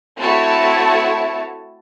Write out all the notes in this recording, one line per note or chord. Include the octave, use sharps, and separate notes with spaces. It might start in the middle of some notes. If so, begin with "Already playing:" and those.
A3 C4 E4 F#4 C#5 A5